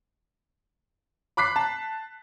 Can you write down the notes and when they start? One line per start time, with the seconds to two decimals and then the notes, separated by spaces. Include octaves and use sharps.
1.37 B5 D6 F#6 B6 C7
1.56 A5